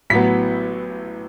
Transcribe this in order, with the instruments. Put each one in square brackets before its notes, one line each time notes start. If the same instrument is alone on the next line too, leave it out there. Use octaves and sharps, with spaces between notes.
[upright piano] A1 A2 F#3 B3 B6